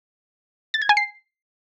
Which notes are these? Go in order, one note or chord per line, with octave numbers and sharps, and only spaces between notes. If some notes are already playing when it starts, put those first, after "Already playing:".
A6
G#6
G#5
C7